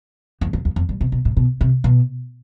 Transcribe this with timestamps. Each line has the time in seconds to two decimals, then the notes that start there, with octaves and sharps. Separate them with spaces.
0.41 E2
0.53 F2
0.65 E2
0.76 F2
0.89 G2
1.01 C3
1.12 B2
1.25 A2
1.37 B2
1.61 C3
1.84 B2